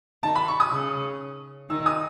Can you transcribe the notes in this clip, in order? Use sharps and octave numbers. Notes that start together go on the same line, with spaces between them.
D#3 D#4 A5
B5
C#6
D#6
C#3 C#4
D#3 D#4 E6
D#6